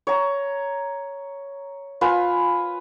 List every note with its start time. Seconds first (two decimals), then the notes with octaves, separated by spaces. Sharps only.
0.07 C#5 A#5
2.01 F4 B4 G#5